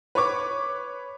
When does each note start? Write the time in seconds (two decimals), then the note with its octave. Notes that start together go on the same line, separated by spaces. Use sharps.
0.15 B4 C#5 C#6 D6